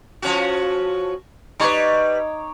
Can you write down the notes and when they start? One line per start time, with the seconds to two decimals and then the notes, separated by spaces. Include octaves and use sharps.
0.22 F3 C#4 F#4
1.60 G3 D#4 B4 C#5 D6